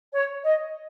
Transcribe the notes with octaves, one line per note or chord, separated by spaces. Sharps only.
C#5
D#5